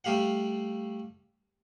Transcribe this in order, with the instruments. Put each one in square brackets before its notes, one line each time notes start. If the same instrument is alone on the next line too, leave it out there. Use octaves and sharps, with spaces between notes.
[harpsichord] G3 A3 G4 F5 F#5